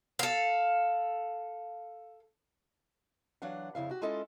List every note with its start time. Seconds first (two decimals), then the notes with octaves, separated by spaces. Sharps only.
0.19 A4 F5
3.42 E3 F#3 D4 F5 F#5
3.75 F2 C#3 E4 F5
3.89 F#4 G4
4.02 G#3 C#4 E4 F4 A4 D#5